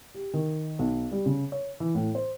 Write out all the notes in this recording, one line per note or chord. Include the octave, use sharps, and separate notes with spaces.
G4
D#3
B1
G3
C#3
C#5
E3
A2
C5